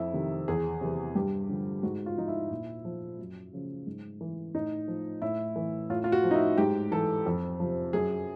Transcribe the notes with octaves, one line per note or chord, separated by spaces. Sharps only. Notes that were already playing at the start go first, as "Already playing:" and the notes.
Already playing: F2 E4
C3 D#3
E2 G#4
C3 E3
G2 G4
D3 F3
G#2 F#4
F4
F3 D#4
E4
A#2
F3
F#2
C#3 F3
G#2
E3
A2 D#4
F3
A2 E4
E3
A2 F4
F4
F#4
F3
D#4
E4
G#2 G4
E3 A4
F2
C3 F3
F#2 G#4